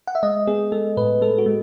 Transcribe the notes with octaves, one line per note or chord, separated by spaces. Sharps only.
F#5
E5
G#3 D#5
B3 G#4
G#3 A4
A2 B4
G#3 A4
F#4
G#3